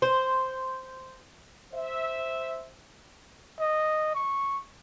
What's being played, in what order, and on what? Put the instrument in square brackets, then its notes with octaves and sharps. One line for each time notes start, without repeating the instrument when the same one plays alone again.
[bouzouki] C5
[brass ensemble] C5 E5
[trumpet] D#5
C#6